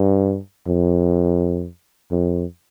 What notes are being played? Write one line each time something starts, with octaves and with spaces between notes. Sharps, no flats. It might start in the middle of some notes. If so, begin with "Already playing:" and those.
Already playing: G2
F2
F2